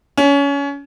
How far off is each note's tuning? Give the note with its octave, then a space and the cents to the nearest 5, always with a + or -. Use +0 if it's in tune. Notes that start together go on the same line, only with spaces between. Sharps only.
C#4 +25